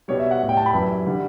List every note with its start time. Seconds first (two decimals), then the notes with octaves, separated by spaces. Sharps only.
0.08 B2 G3 C#5
0.19 E5
0.31 F#5
0.41 A2 G3
0.49 G5
0.57 A5
0.66 B5
0.74 F#2 E3 G3
1.06 D3 G3